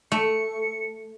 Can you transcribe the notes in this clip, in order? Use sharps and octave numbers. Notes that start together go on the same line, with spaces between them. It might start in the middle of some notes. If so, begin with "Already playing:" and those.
A3 C#7